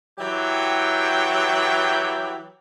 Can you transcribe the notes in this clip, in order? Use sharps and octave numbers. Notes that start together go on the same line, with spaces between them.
E3 F#3 G4 E5 G5